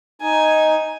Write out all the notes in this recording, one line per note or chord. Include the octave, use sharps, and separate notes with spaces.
D#4 G#5